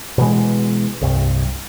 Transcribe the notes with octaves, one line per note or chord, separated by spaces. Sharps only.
B2 E3 G#3
C2 G2